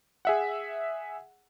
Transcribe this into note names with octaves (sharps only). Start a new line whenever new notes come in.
G#4 E5 F#5